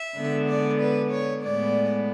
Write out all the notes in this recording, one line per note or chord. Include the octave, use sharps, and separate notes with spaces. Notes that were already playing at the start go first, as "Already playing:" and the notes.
Already playing: E5
D3 G#3 B3
D5
B4
C#5
A2 G#3 B3 D5